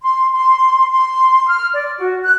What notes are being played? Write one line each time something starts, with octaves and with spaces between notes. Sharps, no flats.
C6
C6
C6
F6
D5
F#4
F#6